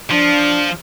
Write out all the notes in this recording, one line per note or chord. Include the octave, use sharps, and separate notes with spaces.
F3 D4